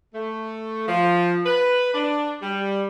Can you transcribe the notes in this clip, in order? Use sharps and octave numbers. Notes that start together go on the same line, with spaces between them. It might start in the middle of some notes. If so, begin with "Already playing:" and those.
A3
F3
B4
D4
G3